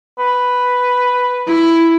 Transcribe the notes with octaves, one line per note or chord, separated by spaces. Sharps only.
B4
E4